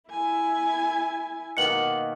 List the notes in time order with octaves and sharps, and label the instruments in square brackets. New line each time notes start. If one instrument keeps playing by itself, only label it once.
[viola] E4 G#5
[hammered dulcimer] B2 D#3 A#3 [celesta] C#7 F#7